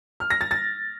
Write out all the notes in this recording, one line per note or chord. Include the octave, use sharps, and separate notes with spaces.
F6
A#6
A6
A6